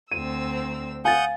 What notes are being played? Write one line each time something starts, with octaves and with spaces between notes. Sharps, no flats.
D2 C4 E6 D#7
F5 F#5 G#5 D#6 G6 A6